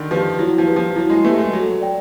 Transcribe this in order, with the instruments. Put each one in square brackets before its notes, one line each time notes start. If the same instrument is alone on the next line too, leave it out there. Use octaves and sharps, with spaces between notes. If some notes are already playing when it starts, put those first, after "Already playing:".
Already playing: [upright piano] D3 D#3
[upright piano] F3 [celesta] G4 B4
[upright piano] F#3 [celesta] E4
[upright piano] F3
[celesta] G4 B4
[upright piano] F3
[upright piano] F#3 [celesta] E4
[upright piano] G#3
[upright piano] A3 [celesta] G4 B4
[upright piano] G#3
[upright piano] F#3 [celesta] A4
[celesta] D5 G5